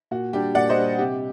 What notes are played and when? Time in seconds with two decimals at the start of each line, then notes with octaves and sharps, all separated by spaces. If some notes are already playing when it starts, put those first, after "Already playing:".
0.11 A#2 F#4
0.33 G3 D4 G4
0.55 A#2 D5 F#5
0.69 C5 D#5
0.77 G3 D4
0.99 C3 G4